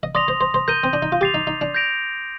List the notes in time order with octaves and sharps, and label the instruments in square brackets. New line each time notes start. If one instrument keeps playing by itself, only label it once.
[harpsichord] D#5
[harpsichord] D5 [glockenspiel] C6 D#6 A#6 F7
[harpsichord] C5
C5
C5
[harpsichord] A#4 [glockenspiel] G6 A#6 D#7 G7
[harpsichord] C4
D4
D#4
F4
[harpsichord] G4 [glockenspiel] D6 A6 C7 F7
[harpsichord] D#4
D#4
D4
[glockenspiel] G6 A#6 D7 F7